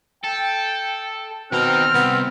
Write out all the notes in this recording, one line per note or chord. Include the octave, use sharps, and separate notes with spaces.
A4 G5
B2 D#3 C4 A#5 F6
C2 B3